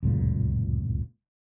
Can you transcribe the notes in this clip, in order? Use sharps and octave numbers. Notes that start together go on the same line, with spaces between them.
D1 C#2 F#2 A#2